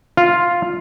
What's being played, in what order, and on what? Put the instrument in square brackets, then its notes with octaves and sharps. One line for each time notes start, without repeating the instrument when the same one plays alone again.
[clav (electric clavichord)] F4